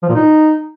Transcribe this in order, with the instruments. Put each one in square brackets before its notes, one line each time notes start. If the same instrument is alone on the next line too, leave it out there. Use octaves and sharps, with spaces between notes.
[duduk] F3
A#2
D#4